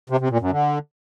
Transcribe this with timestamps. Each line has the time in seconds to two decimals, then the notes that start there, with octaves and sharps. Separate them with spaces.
0.10 C3
0.20 C3
0.30 A#2
0.41 F#2
0.51 D3